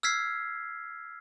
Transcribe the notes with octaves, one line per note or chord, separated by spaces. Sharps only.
E6 F6 G#6 B6 C7